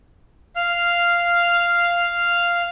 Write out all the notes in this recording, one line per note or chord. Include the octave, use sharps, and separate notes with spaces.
F5 F6